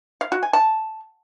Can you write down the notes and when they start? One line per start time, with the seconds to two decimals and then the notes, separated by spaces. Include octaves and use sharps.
0.21 F5
0.32 F#4
0.43 G#5
0.53 A5